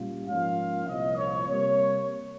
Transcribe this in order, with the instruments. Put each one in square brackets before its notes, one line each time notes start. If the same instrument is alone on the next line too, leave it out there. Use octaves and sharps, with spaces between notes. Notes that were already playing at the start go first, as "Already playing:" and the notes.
Already playing: [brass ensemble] A#2 G3 C#4 F4
G#2 F3 A#3 C#4 F4 F5
C2 A#2 F3 A#3 D#5
C#5
C3 G3 A#3 C#5